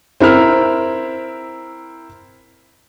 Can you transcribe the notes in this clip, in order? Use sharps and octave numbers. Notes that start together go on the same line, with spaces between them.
C4 E4 A#4 F6